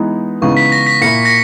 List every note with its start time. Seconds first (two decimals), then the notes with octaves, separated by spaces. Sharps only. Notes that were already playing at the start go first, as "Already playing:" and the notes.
Already playing: E3 G#3 B3 D#4
0.41 C#3 E3 G#3 B3 D#4 C#6
0.57 B6
0.72 A#6
0.87 B6
1.01 A#2 A#3 E4 A#6 C#7
1.25 A#6